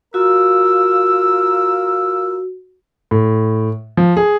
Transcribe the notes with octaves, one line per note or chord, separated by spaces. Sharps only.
F4 F#4 A#4 E6
A2
F3
G#4